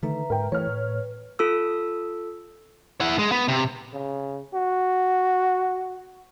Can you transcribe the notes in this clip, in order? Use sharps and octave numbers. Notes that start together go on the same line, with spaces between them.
D3 D#3 A3 B4 E5 A#5
G#2 A#4 G5
E3 A3 B4 C#5 F6
A2
F4 A4 E6
E4 F#5
G#3
B3
C3
C#3
F#4